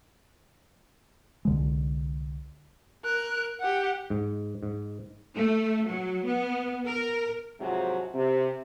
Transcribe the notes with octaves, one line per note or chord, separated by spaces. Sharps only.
C2 D3 G#3
A#4 F#6
G4 F#5
G#2
G#2
A3
F#3
B3
A#4
G#2 C3 F3 F#3
C3